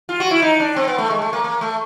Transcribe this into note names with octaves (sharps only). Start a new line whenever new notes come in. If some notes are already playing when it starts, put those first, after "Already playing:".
F4
F#4
E4
D#4
D4
C4
B3
A3
G#3
A3
A#3
A#3
A3